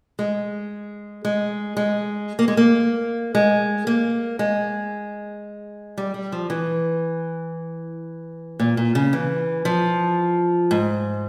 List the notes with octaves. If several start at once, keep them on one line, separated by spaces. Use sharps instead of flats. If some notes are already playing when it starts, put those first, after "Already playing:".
G#3
G#3
G#3
A#3
G#3
A#3
G#3
A#3
G#3
G3
G3
F3
E3
A#2
A#2
C#3
E3
F3
G#2